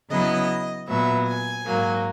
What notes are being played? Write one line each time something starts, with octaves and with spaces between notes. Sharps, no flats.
C#3 F#3 B3 E4 D#5
A#2 F#3 B3 E5
G#5
G#2 F#3 A#3